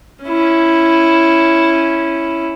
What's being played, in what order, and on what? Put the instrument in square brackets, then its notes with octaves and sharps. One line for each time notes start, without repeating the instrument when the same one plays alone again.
[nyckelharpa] C#4 E4